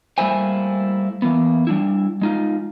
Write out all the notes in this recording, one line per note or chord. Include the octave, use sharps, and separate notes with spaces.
G3 A3 A#3 E4 C5 G#5
E3 A#3 B3
G3 D4 E4
G#3 D#4 F4